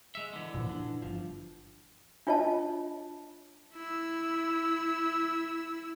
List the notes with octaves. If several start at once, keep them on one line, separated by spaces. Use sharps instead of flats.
G#3 E5
D3 E3
A#2 F3
D4
G1 F3
D4 F4 C#5 D#5 A5
E4 E6